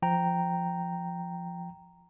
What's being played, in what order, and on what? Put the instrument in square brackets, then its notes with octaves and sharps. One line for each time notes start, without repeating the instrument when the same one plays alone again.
[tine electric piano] F3 G5 A#5